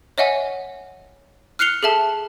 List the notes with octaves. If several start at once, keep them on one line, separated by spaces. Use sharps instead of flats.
C#5 D#5 E5 F#5 G#5
F6 F#6 C7 C#7 F7 G7
G#4 A4 E5 A5